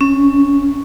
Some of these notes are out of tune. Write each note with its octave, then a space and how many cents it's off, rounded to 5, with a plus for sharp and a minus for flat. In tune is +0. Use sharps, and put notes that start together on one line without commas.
C#4 +0